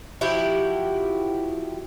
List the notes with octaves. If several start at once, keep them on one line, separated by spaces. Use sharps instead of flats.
F3 E4 F#4 G4